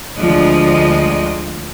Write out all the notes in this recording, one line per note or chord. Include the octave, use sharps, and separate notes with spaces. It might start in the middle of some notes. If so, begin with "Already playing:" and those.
D2 F3 G#3 D5 D#5